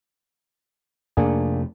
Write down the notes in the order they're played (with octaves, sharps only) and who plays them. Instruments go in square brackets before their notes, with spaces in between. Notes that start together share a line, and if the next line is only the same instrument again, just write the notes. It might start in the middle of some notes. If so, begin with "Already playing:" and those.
[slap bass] F2 C3 A3 [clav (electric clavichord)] A#3 D4 G#4